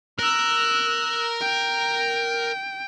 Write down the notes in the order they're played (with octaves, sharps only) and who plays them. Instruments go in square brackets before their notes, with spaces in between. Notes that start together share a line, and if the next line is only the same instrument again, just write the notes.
[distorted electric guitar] A#4 [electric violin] E6 F#6
[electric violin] G5